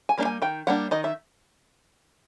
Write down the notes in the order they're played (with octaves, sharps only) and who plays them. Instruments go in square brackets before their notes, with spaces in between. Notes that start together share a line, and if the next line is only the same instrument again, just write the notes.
[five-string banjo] G#5
G3 A#3 D4
G#5
D#3 G5
G3 A#3 D4 F#5
D#3 D#5
E5